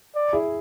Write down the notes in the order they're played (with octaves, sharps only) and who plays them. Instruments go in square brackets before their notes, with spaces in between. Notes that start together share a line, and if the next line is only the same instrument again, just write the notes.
[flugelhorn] D5
[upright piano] E4 G#4